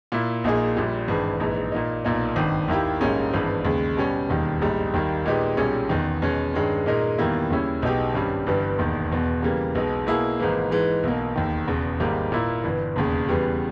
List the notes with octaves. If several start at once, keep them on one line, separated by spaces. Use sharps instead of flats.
A#2 A#3 E4
A#1 A#2 A#3 D#4 G#4
A#1 A#2 G3
G#1 G2 E3 G#3
A#1 G#2 E3
A#2 A#3 D#4
B1 A#2 A#3 D#4
G#1 G2 D#3
D#2 D#3 A#3 E4 G4
A#1 G#2 G3 A#3 C#4
G#1 G2 E3 G#3 B3
D#2 C#3 G#3
B2 G3 C#4
E1 D#2 D#3 G3
A#1 G#2 G3
D#2 D#3 G3 A#3
A#2 G#3 B3 D#4 G4
B1 A#2 G3 C#4 G#4
E1 E2 D#3
E2 B2 G#3 C#4
G2 D#3 G#3 C#4
A#2 G#3 D#4 A#4
E2 D#3 G3 A#3 E4
D#2 C#3 G3 C#4 E4
B1 B2 G#3 D#4 G4
G#1 G2 G3 C#4
G1 G2 E3 G3 B3
E1 D#2 D#3
E1 E2 B2
C#3 E3 G3 A#3
B1 B2 G#3 D#4
B2 A#3 E4 G#4
G#1 G#2 E3 A#3
G#2 E3 G#3
B1 B2 A#3
E1 D#2 D#3
E1 E2 C#3
G#1 G#2 G3 A#3
A#2 A#3 E4
G1 G2 E3
E1 D#2 C#3
E2 C#3 E3 G3 B3